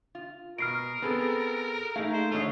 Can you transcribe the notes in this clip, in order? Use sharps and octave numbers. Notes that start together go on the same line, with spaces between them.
F4
B2 A#4 F6 C7 D7
B3 C4 G#4 A4 B4
A3 A#3 D#4 G#4 F5
C5
D3 A3 F4 G#4 C#5 D#5